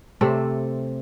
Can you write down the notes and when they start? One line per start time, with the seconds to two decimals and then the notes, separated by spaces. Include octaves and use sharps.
0.21 C3 A3 C4 D5